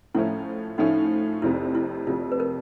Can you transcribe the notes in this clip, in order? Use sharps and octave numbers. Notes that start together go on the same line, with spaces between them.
A2 F3 A3 C#4 E4
A2 F3 A3 C#4 D#4
F1 F2 C3 E4
E4
F1 F2 C3 F4
B4
A#4